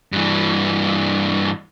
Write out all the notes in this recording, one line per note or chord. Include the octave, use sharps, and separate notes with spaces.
G2 E3